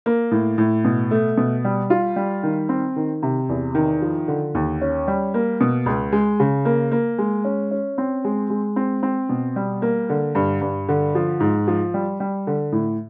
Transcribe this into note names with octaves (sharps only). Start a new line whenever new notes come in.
A#3
A2
A2
B2
A3
B2
G3
F4
G3
D#3
C4
D#3
C3
E2
D#3
F3
D3
D#2
C#4
G3
A#3
B2
C#2
G#3
C#3
A#3
A#3
G#3
C#4
C#4
C4
G#3
G#3
C4
C4
B2
G3
A#3
D3
G2
G2
D3
F3
G#2
F3
G3
G3
D3
A2